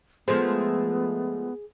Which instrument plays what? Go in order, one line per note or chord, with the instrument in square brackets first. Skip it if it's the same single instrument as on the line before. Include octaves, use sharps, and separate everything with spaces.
[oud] F3 G#3 A3 [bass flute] B3 [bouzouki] G#4 [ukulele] C5